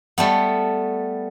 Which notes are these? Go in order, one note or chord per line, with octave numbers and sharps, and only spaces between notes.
G3 A3 B3